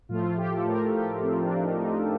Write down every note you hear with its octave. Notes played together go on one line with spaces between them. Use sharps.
A2 F3 A3 F4
F4
G4
A4
A2 F3 A3 A#4
G4
A2 F3 A3 C4
D4
D#4
A2 F3 A3 D#4